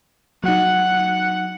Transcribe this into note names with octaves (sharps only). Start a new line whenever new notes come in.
F#3 D#4 F#5